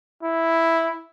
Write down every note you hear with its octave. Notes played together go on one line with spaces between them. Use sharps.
E4